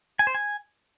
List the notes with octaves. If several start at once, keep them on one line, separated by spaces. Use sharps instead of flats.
G#5
C5
G#5